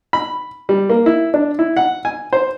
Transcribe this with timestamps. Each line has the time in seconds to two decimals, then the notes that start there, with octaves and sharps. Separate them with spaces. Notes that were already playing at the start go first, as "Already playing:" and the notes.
0.13 B5
0.69 G3
0.89 A#3
1.06 E4
1.34 D4
1.59 E4
1.77 F#5
2.05 G#5
2.33 C5